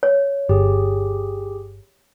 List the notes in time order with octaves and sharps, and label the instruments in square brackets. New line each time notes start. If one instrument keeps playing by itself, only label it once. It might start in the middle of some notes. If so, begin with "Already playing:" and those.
[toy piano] C#5
[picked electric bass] G1 [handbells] G4 G#4